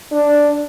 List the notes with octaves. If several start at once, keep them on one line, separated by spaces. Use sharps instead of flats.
D4